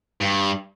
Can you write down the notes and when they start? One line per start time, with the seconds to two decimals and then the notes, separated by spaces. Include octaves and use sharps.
0.21 G2